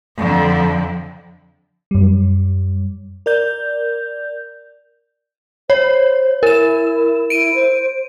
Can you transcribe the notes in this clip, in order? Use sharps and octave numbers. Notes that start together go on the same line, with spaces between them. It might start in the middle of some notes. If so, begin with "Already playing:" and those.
F2 D3
F#2 G3
A#4 D5 G6
C5 C#5
E4 A#4 E7
E4 D7 D#7
C5